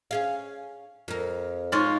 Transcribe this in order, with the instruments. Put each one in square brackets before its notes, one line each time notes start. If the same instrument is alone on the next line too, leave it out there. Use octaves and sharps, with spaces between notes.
[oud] C#4 G#4 F5
F2 A#4
[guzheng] G#2 F4 C#5